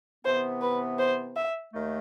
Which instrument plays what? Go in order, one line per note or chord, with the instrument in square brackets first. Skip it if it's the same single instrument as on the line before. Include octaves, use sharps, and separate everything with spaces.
[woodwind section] C3 E3 B3 [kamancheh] C5
[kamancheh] B4
C5
E5
[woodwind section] D#2 D#3 A3